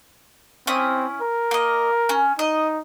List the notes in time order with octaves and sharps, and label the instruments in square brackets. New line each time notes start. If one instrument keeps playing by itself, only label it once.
[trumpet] C4 [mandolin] C#4 E4 D#6
[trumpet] A#4
[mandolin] A#3 D#5
C#4
[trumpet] D#4 [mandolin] D#5